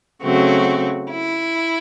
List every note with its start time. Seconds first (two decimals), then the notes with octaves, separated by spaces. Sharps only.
0.22 C#3 F#3 A3 C4 F#4
1.09 E4